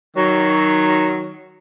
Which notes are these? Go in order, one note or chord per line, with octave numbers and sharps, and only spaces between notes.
D#3 F#3